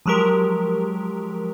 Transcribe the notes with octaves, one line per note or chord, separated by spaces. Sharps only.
F3 F#3 G#3 G4 A#4